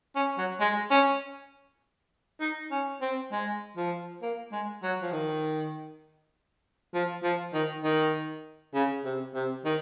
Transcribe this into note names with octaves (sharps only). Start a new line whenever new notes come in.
C#4
F#3
G#3
C#4
D#4
C#4
C4
G#3
F3
A#3
G#3
F#3
F3
D#3
F3
F3
D#3
D#3
C#3
C3
C3
D#3